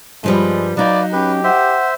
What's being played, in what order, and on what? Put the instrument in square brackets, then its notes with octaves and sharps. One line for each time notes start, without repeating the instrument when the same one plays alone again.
[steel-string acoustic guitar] G2 F3 G3 [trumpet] G#3
[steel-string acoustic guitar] F#3 D#4 [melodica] B4 [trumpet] D5 [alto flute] F5
[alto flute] C#4 [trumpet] G4 [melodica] B4
[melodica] C5 E5 [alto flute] F#5